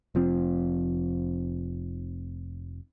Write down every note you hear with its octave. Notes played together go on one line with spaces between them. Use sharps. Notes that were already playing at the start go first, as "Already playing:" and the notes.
F1 F3 C4